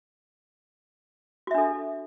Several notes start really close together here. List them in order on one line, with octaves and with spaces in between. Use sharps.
F#4 E5 D4 A4